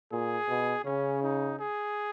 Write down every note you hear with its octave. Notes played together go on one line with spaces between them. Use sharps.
A#2 G#4
B2
C#3 C#4
D#4
G#4